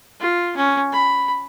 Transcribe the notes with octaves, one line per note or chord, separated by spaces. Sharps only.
F4
C#4
B5